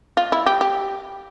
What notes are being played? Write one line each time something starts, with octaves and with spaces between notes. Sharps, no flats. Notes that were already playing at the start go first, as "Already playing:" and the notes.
F4
E4
G4
G4